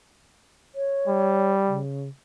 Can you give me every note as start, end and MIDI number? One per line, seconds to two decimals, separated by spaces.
0.75 1.53 73
1.08 1.81 55
1.67 2.08 49